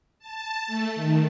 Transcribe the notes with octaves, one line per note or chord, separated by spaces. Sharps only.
A5
A3
D#3